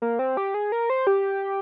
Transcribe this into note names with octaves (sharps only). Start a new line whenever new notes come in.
A#3
C4
G4
G#4
A#4
C5
G4